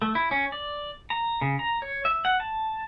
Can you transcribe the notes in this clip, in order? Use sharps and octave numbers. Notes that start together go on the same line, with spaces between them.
A3
E4
C#4
D5
A#5
C#3
A#5
C#5
E5
F#5
A5